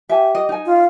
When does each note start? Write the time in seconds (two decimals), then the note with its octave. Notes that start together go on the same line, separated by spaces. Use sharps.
0.09 G4 E5 G#5
0.35 D#5
0.49 D#4 G#5
0.66 F4